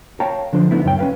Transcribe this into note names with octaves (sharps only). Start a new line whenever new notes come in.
C#5 F5 G5 A5 A#5
D3 F3 D4 C5
D3 A3 B3 D#4 E4
C#2 F#2 A2 C#5 E5 G5
C#4 B4 F5